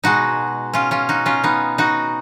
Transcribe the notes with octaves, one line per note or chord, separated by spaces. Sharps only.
B2 G#3 D#4 F#4
C#4 F4
C#4 F4
D#4 F#4
C#4 F4
B3 D#4
D#4 F#4